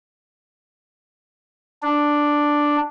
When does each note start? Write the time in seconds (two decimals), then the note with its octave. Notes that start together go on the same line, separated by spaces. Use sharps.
1.83 D4